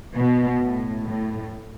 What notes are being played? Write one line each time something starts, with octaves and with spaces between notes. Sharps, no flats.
B2
A2
A2